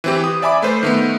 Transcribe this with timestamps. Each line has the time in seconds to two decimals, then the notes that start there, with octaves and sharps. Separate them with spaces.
0.04 E3 C4 G4
0.24 D#6
0.42 D5 E5 G#5 B5 D6
0.62 A3 B4 C5
0.83 D#3 A3 B3